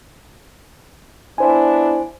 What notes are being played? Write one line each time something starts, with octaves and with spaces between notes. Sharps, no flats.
B3 D4 E4 C5 G#5